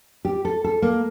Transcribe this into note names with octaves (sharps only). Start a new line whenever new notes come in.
G4
A4
A4
A#3